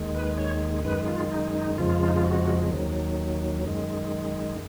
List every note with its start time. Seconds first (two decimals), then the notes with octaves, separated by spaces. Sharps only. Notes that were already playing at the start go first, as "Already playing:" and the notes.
Already playing: D#2 D#3 G#3
0.15 B4
0.38 C#5
0.84 F#2 D#3 G#3 B4
1.08 F4
1.31 D#4
1.55 D#4
1.78 F2 C#3 F3 G#3 F4
2.08 D#4
2.16 F4
2.25 F#4
2.71 D#2 D#3 F#3
3.64 F#2 D#3 G#3